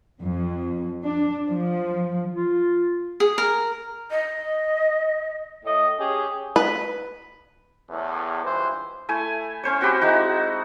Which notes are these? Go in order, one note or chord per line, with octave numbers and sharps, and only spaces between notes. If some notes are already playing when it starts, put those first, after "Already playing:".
F2
D4
F3
F4
G#4
A#4
D#5
A2 D#5
C#4 G4 G#4
B4
E2 A2
C#2 G2 E3 C5
A3 E4 G#5
C#4 C5 C#5
C4 F#4 G4 B5
G#3 D#4 E4 F#4